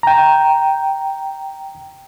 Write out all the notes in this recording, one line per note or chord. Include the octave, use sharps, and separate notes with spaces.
G5 A#5